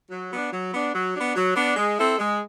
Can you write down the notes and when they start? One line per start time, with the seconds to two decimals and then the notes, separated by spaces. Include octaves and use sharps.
0.10 F#3
0.32 B3 D4
0.52 F#3
0.73 B3 D4
0.94 F#3
1.14 B3 D4
1.35 F#3
1.55 B3 D4
1.76 G#3
1.97 C4 E4 A4
2.18 G#3